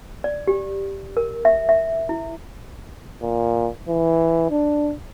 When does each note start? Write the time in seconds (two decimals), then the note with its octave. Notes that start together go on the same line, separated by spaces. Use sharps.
0.24 D5
0.47 G4
1.17 A#4
1.45 E5
1.69 E5
2.09 E4
3.22 A#2
3.88 E3
4.50 D4